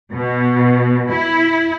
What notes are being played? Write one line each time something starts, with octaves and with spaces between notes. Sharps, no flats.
B2
E4